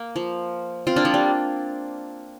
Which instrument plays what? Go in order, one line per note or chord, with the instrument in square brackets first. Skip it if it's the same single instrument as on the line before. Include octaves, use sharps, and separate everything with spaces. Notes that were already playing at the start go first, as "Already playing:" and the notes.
Already playing: [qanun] A#3
F3
C4 F4
A#3 D4
F3
G3